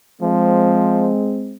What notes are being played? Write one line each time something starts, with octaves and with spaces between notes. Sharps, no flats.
F3 G#3 C4